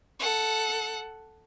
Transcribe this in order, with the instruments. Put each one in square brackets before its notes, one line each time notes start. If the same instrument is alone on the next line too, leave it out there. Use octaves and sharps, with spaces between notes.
[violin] A4 F#5